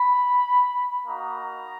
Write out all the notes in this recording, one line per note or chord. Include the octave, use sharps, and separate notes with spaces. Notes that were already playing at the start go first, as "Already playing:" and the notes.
Already playing: B5
A#3 D#4 F#4 A#5